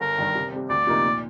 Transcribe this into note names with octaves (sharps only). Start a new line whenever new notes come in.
G1 A#4
G2 D#3
C3
G3 C4
D2 D5
C3 F3 A#3 D#4
A#2